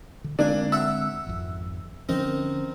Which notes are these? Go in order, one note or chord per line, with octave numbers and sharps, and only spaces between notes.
D3
D3 G#3 A#3 C4 D4 G#5
E5 F#5 E6
G#1 F2
D3 F3 C4 C#4 D#4 A#4